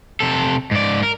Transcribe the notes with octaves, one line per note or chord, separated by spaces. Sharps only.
C3 A4
G#2 D5
A#4